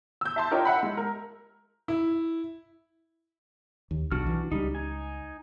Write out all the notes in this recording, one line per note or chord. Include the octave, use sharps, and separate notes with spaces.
E6 G6
E5 A5 C6
D4 F4 A#4 C#5 D#5 G5
E5 F#5 B5
G#3
A#4
E4
D#2
B1 D4 F#4 F6
E3
C#2 G3 D#4
D#4 G#5